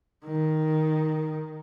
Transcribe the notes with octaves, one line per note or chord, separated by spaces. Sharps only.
D#3